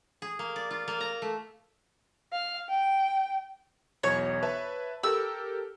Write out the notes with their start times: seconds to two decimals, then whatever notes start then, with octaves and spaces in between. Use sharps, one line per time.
0.22 G#4
0.39 A#3
0.56 D5
0.71 F4
0.88 A#3
1.01 A#5
1.22 A3
2.32 F5
2.70 G5
4.03 B1 E2 C#5
4.43 B4 E5 A5
5.03 G4 A4 A#4 E6